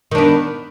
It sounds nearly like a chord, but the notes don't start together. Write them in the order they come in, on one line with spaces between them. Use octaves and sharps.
D#3 D4 B3